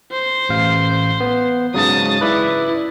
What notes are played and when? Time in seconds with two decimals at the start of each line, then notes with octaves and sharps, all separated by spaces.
0.11 C5
0.49 A1 F5
1.20 B3
1.74 G#2 C#3 F#3 A5 D#6
2.21 E4 B4 D5 E5